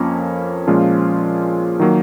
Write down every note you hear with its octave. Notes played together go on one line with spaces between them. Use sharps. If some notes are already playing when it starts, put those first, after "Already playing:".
Already playing: F2 F3 A#3 C#4
A#2 F3 G#3 C#4 F4
D#3 F#3 A#3